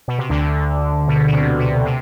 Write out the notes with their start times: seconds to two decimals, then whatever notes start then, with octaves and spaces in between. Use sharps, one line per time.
0.08 B2
0.18 C3
0.30 D2 D3
1.08 B2
1.27 B2
1.32 C3
1.59 B2
1.85 C3